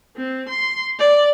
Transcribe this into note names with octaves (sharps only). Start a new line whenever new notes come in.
C4
C6
D5